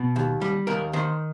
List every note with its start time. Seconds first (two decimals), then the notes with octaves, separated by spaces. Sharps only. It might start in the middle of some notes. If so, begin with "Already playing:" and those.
Already playing: B2
0.16 D#2
0.41 G3
0.67 D#2 A#4
0.93 D#3 C5